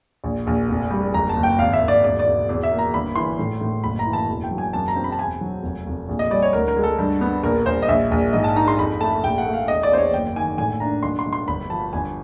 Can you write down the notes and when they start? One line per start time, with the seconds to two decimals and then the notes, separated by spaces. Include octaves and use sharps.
0.24 A#1
0.47 A#1
0.69 F1
0.91 G3
1.14 F#1 A#5
1.29 A5
1.36 F#1
1.43 G5
1.58 G#1 F5
1.73 E5
1.81 G#1
1.88 D5
2.04 E1 D5
2.19 D5
2.26 E1
2.49 E2
2.63 E5
2.71 A#3
2.79 A#5
2.94 G1 B5
3.16 E3 C6
3.39 A2
3.61 A2
3.84 F#1 B5
3.99 A#5
4.07 E3
4.13 A5
4.29 E1
4.44 G5
4.51 F#3
4.58 G#5
4.73 F#2 A5
4.88 A#5
4.96 C4
5.04 B5
5.12 A5
5.19 E1 G#5
5.41 F#3
5.63 F1
5.87 F1
6.09 A#1
6.19 D#5
6.30 G3 D5
6.42 C#5
6.53 D2 A#4
6.68 A#4
6.77 G#3
6.83 A4
6.99 G2
7.21 B3
7.43 A#1 A#4
7.66 A#1 C5
7.82 D#5
7.88 A#1 E5
8.11 A#1
8.33 G#2 D#5
8.44 A5
8.56 D#4 A#5
8.68 C6
8.78 F2 B5
9.00 A3 A5
9.24 A#1 G5
9.38 F#5
9.46 A3
9.53 F5
9.68 E2 D#5
9.83 D5
9.91 E2 C5
9.98 C#5
10.13 F#1 G5
10.36 D#3 G#5
10.58 A2 G#5
10.80 D4 A#5
11.03 B1 C6
11.19 C6
11.25 B1
11.33 C6
11.48 G1 B5
11.70 F3 A5
11.93 G1 G#5